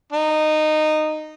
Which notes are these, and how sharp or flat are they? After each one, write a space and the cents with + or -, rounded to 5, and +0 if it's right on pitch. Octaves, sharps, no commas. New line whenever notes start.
D#4 -15